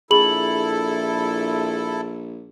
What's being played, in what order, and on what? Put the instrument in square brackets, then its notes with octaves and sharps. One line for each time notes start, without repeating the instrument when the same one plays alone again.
[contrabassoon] A#1 [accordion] E4 A4 [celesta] G#4 B5 F#7